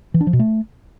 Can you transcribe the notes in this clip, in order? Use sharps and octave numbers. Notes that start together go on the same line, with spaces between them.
E3
D4
F3
B2
A3